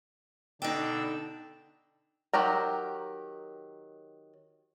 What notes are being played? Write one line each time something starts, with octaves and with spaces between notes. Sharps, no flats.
B2 D3 D4 D#4 G5 E6
D#3 F#3 G4 A#5